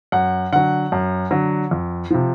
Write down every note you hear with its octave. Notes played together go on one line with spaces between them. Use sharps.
F#2 F#5
D3 F#3 F#5
F#2
D3 F#3
F2
C3 F3